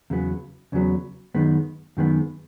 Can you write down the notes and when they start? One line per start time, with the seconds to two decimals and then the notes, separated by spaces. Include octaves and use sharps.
0.10 E2 C#3 F#3 B3
0.72 E2 C#3 F#3 B3
1.34 F#2 D#3 G#3 B3
1.97 F#2 D#3 G#3 B3